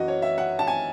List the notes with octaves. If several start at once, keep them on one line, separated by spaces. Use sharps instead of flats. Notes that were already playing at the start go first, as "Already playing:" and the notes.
Already playing: F#2 E3 F#4 D#5
C#5
E5
F#5
A5
G#5